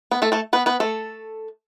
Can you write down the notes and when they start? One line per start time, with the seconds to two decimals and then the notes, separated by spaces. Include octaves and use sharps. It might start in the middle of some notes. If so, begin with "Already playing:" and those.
0.11 B3 B4
0.22 A3 A4
0.32 A3 A4
0.53 B3 B4
0.66 B3 B4
0.80 A3 A4